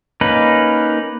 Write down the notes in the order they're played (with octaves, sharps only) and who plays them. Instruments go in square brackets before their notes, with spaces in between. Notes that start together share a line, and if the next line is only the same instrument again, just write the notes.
[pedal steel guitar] A#3 C#4 D#4 B4